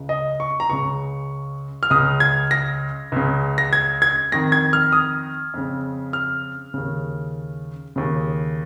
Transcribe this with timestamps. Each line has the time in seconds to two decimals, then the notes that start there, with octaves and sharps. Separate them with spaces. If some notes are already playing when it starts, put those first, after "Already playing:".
Already playing: C#2 C#3
0.09 D#5
0.40 C#6
0.60 A#5
0.70 C#2 C#3 C#6
1.83 F6
1.90 C#2 C#3 D#6
2.20 G#6
2.51 A#6
3.12 C#2 C#3
3.58 A#6
3.73 G#6
4.02 G#6
4.32 F2 D#3 A#6
4.52 G#6
4.73 F6
4.92 D#6
5.54 F2 C#3
6.13 F6
6.74 D#2 C#3
7.96 D#2 C#3